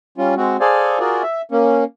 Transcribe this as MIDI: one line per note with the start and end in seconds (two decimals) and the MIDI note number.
0.18 0.34 55
0.18 0.34 61
0.18 0.34 65
0.37 0.57 56
0.37 0.57 60
0.37 0.57 66
0.60 0.99 68
0.60 0.99 69
0.60 0.99 72
0.60 0.99 74
0.60 0.99 77
0.60 0.99 80
0.99 1.23 65
0.99 1.23 66
0.99 1.23 68
0.99 1.23 70
0.99 1.23 74
1.23 1.42 76
1.51 1.84 58
1.51 1.84 61